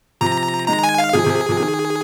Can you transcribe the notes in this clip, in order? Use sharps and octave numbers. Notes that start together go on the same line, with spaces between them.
C3 F3 A#5
D#3 G#3 A#5
G#5
F5
C3 F3 G#4
C3 F3
C3 F3
D#3